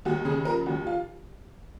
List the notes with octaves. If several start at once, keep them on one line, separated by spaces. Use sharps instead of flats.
D#2 F#4
C#3 G#4
F3 A#4
D#2 F#4
F4